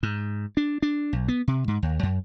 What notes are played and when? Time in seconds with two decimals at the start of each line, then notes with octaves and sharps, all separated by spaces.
0.03 G#2
0.57 D4
0.82 D4
1.13 B1
1.28 B3
1.48 C3
1.68 G#2
1.83 D#2
2.03 F#2